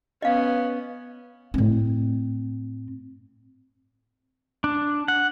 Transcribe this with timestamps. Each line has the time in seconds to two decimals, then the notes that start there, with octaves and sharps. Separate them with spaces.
0.22 B3 C#4 D#5 F5
1.54 A2 C4
4.64 D4
5.08 F#5